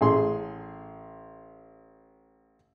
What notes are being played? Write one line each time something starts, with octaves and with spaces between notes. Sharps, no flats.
A1 G#4 C6